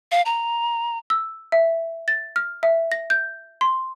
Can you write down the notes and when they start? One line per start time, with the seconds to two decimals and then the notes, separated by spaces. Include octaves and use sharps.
0.12 F5
0.26 A#5
1.10 E6
1.52 E5
2.08 A6
2.36 F6
2.63 E5
2.92 A#6
3.10 G6
3.61 C6